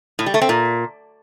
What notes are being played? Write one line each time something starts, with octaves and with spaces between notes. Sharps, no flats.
A2
G3
A3
C4
A#2